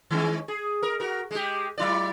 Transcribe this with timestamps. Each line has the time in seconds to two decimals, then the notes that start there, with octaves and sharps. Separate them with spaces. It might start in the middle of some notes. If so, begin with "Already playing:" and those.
0.11 D#3 G#3 C#4
0.48 G#4
0.83 A#4
1.00 F#4 A#4
1.31 G#3 G4
1.78 F#3 E4 D5